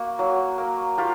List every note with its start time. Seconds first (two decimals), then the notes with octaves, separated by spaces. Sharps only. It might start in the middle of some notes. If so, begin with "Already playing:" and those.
Already playing: A#3 F#4
0.19 F#3
0.58 A#3
0.98 A#3 F4 G4